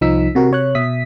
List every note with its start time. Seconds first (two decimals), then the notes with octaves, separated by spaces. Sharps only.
0.01 C2 F3 D#4 E6 B6
0.35 C3 F#4 A#4
0.51 C3 C#5 F#6
0.75 B2 E5 D#6 B6